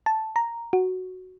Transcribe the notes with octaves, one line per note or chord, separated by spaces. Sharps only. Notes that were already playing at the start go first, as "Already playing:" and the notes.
A5
A#5
F#4